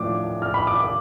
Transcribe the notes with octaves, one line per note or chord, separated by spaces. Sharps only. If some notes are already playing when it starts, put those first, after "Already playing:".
Already playing: A2 F3 A3 D4 D6
F6
B5
D6
D6